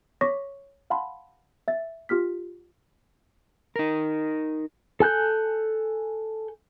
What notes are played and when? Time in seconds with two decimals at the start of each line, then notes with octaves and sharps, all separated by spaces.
0.21 C#5 C#6 D6 A#6 B6
0.90 F5 F#5 A5 B5 C6
1.68 E5 A6
2.09 F4 G4 F6 B6
3.76 D#4 A#4
5.00 A4 G#5 F#6 G6